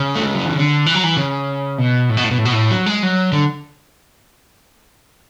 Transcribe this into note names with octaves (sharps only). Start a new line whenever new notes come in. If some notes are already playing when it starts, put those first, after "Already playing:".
Already playing: C#3
A3
G#3
F#3
E3
D3
E3
F#3
E3
C#3
B2
A2
B2
A2
B2
A2
B2
A2
F#3
G#3
F#3
D3